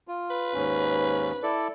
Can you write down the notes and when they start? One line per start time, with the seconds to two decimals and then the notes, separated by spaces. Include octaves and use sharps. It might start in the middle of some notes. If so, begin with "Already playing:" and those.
0.08 F4
0.31 B4
0.54 D#2 G#2 C#4
1.43 E4 A4 D5